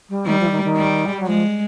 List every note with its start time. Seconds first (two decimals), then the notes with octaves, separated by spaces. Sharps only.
0.09 G3
0.26 D#3 G3
0.39 F3
0.45 E3
0.51 D#3
0.64 D#3
0.76 G3
1.05 G#3
1.12 G3
1.19 F#3
1.26 F3 G#3